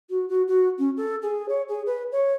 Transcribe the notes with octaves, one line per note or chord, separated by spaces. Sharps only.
F#4
F#4
F#4
C#4
A4
G#4
C#5
G#4
B4
C#5